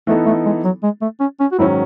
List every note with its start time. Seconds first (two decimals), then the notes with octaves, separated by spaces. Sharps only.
0.07 E3 A3 B3 D#4 A4
0.26 A3
0.46 G#3
0.64 F#3
0.83 G#3
1.01 A3
1.20 C#4
1.40 C#4
1.52 F#4
1.59 G#2 D#3 F#3 C#4 E4